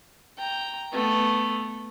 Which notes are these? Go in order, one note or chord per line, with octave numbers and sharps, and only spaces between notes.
G5 A#5
A3 B3